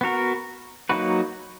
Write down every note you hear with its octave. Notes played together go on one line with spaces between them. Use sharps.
B3 F#4 A#4
F#3 A#3 D#4 F#4 B4